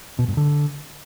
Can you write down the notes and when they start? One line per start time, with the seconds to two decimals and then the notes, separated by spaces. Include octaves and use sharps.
0.19 B2
0.28 G2
0.37 D3